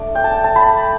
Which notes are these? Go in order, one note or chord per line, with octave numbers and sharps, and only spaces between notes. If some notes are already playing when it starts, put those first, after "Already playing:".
Already playing: A3 D4 D5
G5
A5
A5
B5